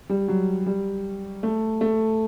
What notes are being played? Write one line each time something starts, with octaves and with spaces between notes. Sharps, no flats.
G3
F#3
G3
A3
A3